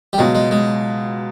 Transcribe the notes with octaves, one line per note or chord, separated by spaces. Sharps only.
G3
C#2 B2 F#3 G#3
G#3
G#3